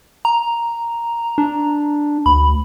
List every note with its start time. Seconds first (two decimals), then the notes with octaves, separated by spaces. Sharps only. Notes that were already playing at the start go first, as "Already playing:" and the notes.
0.25 A#5
1.38 D4
2.26 D2 B5